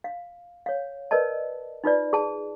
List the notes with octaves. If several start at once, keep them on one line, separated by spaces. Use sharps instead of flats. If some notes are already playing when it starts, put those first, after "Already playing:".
F5
C#5 F5
A#4 B4 D5 D#5 A5
D#4 F4 B4 D5
G#4 A5